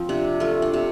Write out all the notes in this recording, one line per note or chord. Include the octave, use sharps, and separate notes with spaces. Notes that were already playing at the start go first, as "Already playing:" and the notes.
Already playing: F3 C4
C3 D4
A3 F4
D4
C3